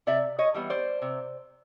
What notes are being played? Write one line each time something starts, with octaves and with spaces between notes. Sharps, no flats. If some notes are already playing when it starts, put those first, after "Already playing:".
C3 D5 E5
C#5 D#5
E3 G3 B3
C5 D5
C3